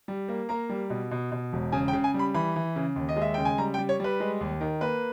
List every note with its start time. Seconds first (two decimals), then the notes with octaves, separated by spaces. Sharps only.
0.08 G3
0.28 A#3
0.49 A#3 A#5
0.69 G3
0.90 B2
1.11 B2
1.32 B2
1.53 E1
1.72 C#3 G#5
1.88 G5
1.93 C#3
2.04 G#5
2.14 G3
2.19 B5
2.34 E3 B5
2.56 E3
2.76 C#3
2.96 D#2
3.09 D#5
3.16 G#3
3.22 E5
3.34 C#3 G5
3.45 G#5
3.58 G3 A#5
3.74 G5
3.78 G3
3.89 C#5
4.00 G3 B4
4.20 G#3
4.41 D#2
4.61 D#3
4.81 A#3 B4